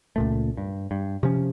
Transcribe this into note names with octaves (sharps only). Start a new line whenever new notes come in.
C#2 A#2 A3
G2
G2
C3 F3 C#4